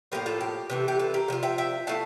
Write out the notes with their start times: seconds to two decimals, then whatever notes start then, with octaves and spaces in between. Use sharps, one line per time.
0.12 A2 F3 A#3 F4 G4 A#4
0.26 F4 A4
0.41 G4
0.70 C3 E3 A3
0.88 G4
0.99 F4 A4
1.14 G4 A#4
1.28 C3 F3 F4
1.43 E5 G5
1.58 E5 G5
1.87 A3 E4 F5 A5